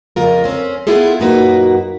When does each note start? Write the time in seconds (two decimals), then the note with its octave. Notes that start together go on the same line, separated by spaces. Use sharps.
0.16 F2 C#3 F4 A#4
0.44 C4 C#4
0.87 B3 E4 F4 G#4 A4
1.20 F#2 A#2 A#3 D#4 F#4 B4